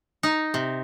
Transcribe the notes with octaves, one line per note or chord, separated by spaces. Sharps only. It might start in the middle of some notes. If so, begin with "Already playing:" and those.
D#4
C3